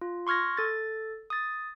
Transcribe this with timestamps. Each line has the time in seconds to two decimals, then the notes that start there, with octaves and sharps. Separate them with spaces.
0.01 F4
0.27 C6 C#6 F6 G#6 A#6
0.57 A4 A6
1.30 D#6 A6